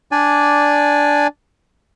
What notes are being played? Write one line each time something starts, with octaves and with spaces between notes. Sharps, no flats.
D4 D5 G#5